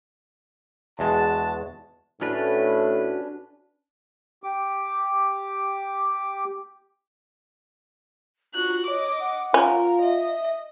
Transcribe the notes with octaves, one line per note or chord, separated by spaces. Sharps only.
E2 G#3 F#4 A5
A2 C#4 D4 F#4 B4
G4 D6
F4 F#4 F#6
C#5 D#5 D6
F#5
C#4 F4 A#4
D#5 E5